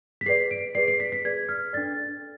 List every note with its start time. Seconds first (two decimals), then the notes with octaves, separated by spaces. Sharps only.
0.21 B6
0.26 G#4 B4 D5 C7
0.51 D7
0.75 G#4 B4 D5 C7
0.88 C7
1.00 B6
1.12 B6
1.25 G#4 B4 D5 G#6
1.49 F6
1.73 D4 A4 D5 A6